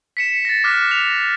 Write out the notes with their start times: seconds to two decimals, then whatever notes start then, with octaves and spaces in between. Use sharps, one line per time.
0.17 B6 C#7 E7
0.45 A6 A#6
0.64 D6 F6 F#6 B6
0.91 A#6 F7